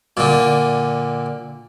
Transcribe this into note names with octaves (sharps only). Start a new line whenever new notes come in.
A#2 D3